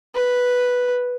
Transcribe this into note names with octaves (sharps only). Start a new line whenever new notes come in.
B4